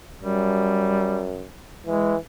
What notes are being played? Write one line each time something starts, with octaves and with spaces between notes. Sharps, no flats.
F#2 G3
E3 G#3